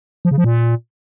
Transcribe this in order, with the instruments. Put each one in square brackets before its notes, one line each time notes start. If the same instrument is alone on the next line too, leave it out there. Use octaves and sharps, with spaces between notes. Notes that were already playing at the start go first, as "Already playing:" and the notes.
[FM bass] F3
C#3
F3
A#2